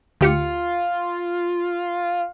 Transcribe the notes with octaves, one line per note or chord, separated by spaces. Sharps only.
D2 F4 G4 C#7